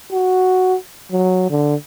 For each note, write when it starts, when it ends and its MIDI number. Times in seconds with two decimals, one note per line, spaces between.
0.12 0.76 66
1.12 1.47 54
1.50 1.75 50